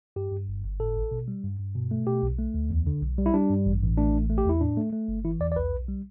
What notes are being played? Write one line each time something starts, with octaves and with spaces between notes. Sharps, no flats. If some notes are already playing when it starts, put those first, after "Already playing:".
G2 G4
G2
G1
G1
A2 A4
A1
B2
G3
G2
G2
B2
A3
B2 G4
B1
A3
D2
E2
D3
B1
G3
E4
G3 D4
G2
A1
A1
A3 D4
A1
A3
G4
E2 E4
A2 D4
A3
A3
G1
E3 E4
E2 D5
D5
B1 B4
B1
G3